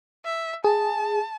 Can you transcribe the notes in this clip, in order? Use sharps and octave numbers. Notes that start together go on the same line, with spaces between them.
E5
G#4 A5